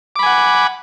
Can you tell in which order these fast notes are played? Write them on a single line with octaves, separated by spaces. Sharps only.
D6 B5 G#5 F#5